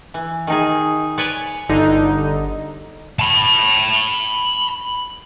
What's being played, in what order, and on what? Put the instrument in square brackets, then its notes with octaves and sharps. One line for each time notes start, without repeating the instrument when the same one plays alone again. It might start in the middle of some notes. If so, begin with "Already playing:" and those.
[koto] E3
D#3 D#4 G#4
B4 C#5 D5 G#5
[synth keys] G1 D3 D#4
[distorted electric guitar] A5 B5